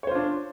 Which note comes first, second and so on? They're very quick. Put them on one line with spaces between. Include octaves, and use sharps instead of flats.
C#5 C5 F4 D4